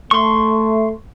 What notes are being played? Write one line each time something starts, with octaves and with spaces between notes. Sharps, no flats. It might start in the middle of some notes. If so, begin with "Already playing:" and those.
A3 C6 C#6